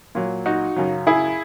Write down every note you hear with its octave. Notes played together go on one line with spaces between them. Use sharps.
A#2 F#3
D#4 F#4
F#2 C#3 F#3
E4 G#4